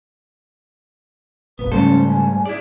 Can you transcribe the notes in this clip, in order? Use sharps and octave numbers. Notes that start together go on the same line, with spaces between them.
F1 A#1 B3 B4
G#2 C#3 G3 A3 C#4 A4 C5
G#5
E4 G#4 D5